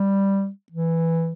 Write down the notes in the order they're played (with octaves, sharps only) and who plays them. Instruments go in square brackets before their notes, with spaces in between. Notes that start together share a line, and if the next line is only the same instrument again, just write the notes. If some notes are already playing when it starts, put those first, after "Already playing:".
Already playing: [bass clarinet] G3
E3